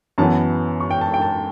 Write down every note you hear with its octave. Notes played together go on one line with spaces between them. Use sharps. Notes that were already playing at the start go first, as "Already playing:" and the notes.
F#2 E3 B3 A5
C#6
G5
A5
G5
A5